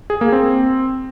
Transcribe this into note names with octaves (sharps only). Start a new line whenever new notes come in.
G#4
A#3
C4